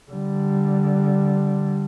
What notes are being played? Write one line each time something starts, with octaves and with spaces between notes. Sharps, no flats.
D3 G3